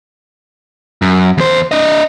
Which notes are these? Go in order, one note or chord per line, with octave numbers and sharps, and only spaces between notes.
F#2
E2 C5
D4 D#5